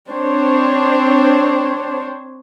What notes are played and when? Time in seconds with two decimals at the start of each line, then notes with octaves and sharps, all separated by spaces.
0.11 C4 D4 C5 C#5